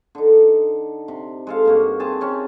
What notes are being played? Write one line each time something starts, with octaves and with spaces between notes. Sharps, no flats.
D3 D#4
C3
G#3 A4 F5
G2 A#3 F#4
C4 G#4 A5
C3 C4 C#4